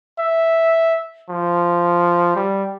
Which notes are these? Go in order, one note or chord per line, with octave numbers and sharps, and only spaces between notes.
E5
F3
G3